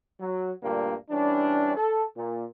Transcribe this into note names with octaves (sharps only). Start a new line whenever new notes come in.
F#3
D2 G2 A#2 D3 G3 A#3
E3 G3 C#4 D4
A4
A#2